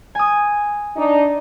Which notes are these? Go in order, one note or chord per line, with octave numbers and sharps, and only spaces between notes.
G#5 D#6
D4 D#4